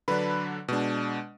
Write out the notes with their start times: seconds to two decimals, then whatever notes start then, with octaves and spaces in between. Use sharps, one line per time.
0.08 D3 F#3 D4 B4 B5
0.68 B2 G#3 D4